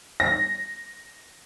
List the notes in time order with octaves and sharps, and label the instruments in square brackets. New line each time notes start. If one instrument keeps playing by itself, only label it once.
[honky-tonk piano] A#6